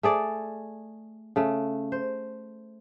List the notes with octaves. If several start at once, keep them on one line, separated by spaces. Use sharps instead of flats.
A3 G#4 D5
C#3 A3
C5